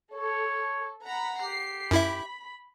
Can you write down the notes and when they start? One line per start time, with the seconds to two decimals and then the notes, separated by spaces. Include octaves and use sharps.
0.13 A4 C#5
1.06 F#5 A#5 B5
1.41 G4 C7
1.91 F#2 E4 E5 B5